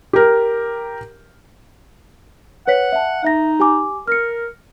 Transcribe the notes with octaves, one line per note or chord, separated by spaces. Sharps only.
G4 A#4
B4 C#5 F#5 B6
E5 A5
D#4 E5 A#6
G4 G#5 D6
A#4 F6 C#7